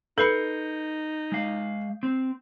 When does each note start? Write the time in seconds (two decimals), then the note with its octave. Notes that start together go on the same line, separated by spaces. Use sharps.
0.18 D#4 A4 B4 B5 G6 C7 C#7
1.32 G#3 F5
2.03 C4